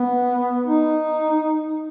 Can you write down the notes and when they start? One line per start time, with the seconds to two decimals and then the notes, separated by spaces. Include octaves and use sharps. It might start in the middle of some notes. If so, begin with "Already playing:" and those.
Already playing: B3
0.66 D#4